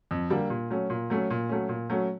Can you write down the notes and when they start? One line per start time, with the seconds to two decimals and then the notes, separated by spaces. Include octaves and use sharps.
0.11 F2
0.30 D3 G3 A#3 D4
0.50 A#2
0.70 F#3 A3 C#4
0.90 A#2
1.10 F#3 A3 C#4
1.30 A#2
1.49 F#3 A3 C#4
1.69 A#2
1.90 F#3 A3 C#4